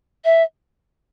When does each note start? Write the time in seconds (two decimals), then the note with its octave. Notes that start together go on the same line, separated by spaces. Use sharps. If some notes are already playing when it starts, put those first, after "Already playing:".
0.25 E5